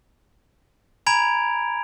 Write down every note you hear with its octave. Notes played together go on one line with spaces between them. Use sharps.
G#5 A#5 B5 G#6 D7 F7